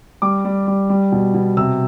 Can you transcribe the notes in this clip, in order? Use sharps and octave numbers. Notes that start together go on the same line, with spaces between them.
G3 D6
G3
G3
G3
B2
B2
C3 E6